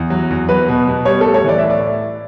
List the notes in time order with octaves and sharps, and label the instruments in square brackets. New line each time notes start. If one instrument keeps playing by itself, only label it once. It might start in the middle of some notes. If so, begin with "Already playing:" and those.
Already playing: [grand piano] E2
F#3
E2
F#3 B4
B2
B2
G3 C#5
A2 A4
C#5
E3 D5
A2 E5
D5